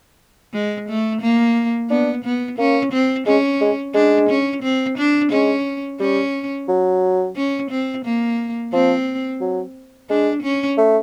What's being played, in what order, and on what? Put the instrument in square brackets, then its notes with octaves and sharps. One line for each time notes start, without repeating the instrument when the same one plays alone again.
[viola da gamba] G#3
A3
A#3
[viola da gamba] B3 [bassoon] D4
[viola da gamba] B3
[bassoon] A#3 [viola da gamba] C#4
[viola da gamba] C4
[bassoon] G#3 [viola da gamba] C#4
[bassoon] G#3
[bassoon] G#3 [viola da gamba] D4
[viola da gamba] C#4
C4
D4
[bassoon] G#3 [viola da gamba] C#4
[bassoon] G3 [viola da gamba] C#4
[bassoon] F#3
[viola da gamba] C#4
C4
A#3
[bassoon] F3 [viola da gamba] C4
[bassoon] F#3
[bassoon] G#3 [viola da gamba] D4
[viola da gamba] C#4
[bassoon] A3